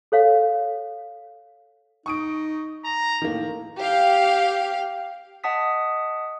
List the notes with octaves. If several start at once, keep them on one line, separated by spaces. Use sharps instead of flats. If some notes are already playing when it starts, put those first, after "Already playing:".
A4 C#5 F5
D#4 C#6 D#6 D7
A#5
A2 D#3 A#3
G4 F5
D#5 F#5 A5 D#6 B6